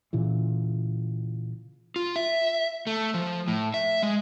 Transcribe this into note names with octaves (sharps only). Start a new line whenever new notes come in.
A#2 C#3 E3
F4
E5
A3
F3
A2
E5
G#3